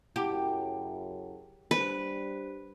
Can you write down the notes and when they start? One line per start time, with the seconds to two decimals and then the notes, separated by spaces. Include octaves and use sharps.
0.16 F#2 C#3 E4 G4 F#5 A5
1.71 G3 D4 B4 C5